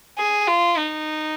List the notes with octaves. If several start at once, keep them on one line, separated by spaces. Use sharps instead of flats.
G#4
F4
D#4